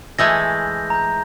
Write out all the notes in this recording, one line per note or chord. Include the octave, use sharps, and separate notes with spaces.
E3 G#3 A3 G6 A#6
A#5 G6